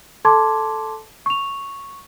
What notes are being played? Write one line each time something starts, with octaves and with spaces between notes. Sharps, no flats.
A4 A5 C6 D6 G#6
C#6 F7